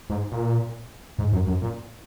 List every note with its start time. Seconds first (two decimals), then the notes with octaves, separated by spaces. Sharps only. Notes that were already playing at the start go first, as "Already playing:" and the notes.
0.10 G#2
0.32 A#2
1.19 G#2
1.33 F#2
1.47 F#2
1.62 A#2